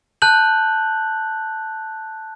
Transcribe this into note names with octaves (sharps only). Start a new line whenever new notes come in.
A5 F#6 G6 F#7